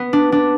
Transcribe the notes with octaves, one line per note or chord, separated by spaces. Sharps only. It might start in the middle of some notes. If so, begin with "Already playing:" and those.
Already playing: B3
D4
D4